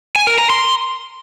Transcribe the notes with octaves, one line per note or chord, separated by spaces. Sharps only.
G#5
A#4
A#5
C6